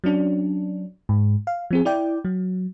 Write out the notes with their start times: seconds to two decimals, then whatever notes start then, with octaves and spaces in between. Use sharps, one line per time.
0.04 F#3 C#4 D4
1.09 G#2
1.47 F5
1.71 F3 C4 G#4
1.85 E4 D5 G5
2.25 F#3